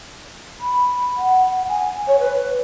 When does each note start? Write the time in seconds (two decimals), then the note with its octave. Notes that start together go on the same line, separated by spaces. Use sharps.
0.60 B5
1.17 F#5
1.68 G#5
2.08 C#5
2.20 B4